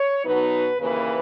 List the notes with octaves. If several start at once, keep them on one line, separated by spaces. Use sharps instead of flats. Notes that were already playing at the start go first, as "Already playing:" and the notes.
Already playing: C#5
B2 F#3 B3 D#4 B4
D#2 C#3 E3 A#3 B4